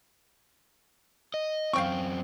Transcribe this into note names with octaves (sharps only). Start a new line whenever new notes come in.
D#5
F#2 C4 F5 G5 C#6